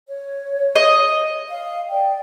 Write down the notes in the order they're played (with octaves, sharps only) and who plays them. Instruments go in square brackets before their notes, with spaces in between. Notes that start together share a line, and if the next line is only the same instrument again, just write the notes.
[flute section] C#5
[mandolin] D#5
[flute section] F5
D5 G5